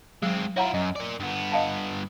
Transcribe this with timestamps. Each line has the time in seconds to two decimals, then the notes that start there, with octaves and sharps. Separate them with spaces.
0.22 F#3 G#3 C4
0.56 E4 F4 C#5 F#5 A#5
0.74 F#2 D#5
0.96 A#4 D5
1.20 G2 B3
1.52 D#5 F5 A5